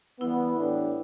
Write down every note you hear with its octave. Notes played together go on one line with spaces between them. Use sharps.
E3 G3 B3 E4
A2 E3 B3 D4 G4